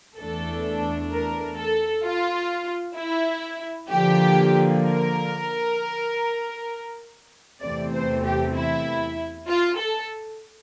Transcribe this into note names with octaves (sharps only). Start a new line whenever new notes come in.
E2 E3 A3 D4 A4
A#4
A4
F4
E4
D3 F3 A#3 G4
A#4
E2 C3 E3 A3 C4 D5
C5
G4
E4
F4
A4